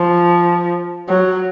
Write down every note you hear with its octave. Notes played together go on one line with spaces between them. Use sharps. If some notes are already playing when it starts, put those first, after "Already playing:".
Already playing: F3
F#3